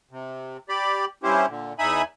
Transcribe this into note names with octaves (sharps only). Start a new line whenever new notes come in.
C3
G4 D5 B5
G2 C#4 E4 G4 C5
A#2 D3
E2 D#4 E5 G#5 B5 D#6